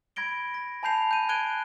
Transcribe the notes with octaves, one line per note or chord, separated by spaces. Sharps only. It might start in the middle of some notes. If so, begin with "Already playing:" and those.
B5 G#6 A#6 D7 G7
A#6
G#5 A5 B5 G6 C7 F7
G6 D#7
F#6 G#6 D7 D#7 G7